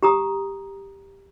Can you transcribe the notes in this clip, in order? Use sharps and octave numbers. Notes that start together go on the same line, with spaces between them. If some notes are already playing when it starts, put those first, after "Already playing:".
G4 A#5 D#6